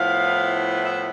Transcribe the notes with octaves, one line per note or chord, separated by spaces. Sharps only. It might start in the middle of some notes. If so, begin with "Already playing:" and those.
Already playing: A2 F3 B3 E4 F5
E5